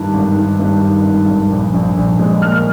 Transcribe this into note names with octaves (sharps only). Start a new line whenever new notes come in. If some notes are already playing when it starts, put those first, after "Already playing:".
Already playing: G2 D#3
G#1
D#3
G2
D#3
G#1
G#1
A#1
A#1
A#1
G#3
A#2 F6